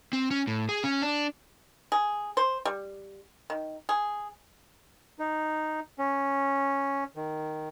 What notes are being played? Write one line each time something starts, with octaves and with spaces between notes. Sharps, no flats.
C4
C#4
A2
G#4
C#4
D4
G#4
C5
G3
D#3
G#4
D#4
C#4
D#3